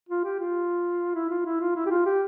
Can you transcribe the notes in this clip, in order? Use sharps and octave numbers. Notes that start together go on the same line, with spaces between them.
F4
G4
F4
E4
F4
E4
F4
E4
G4
F4
G4